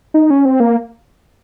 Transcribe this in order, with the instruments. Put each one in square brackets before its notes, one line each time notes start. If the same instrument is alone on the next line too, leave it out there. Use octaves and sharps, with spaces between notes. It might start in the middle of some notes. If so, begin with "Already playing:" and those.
[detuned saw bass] D#4
C#4
C4
A#3